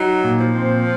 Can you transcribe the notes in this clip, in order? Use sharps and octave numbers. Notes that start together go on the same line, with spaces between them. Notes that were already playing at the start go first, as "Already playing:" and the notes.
Already playing: F#3 D#4
A#2
F3
C4